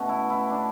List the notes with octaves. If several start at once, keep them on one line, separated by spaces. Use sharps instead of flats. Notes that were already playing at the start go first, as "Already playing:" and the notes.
Already playing: B2 A3 C#4 F#4
E4
E4
D4